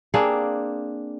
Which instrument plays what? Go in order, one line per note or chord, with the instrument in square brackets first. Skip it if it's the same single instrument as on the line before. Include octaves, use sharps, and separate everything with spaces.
[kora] A#3 C4 D4 G#4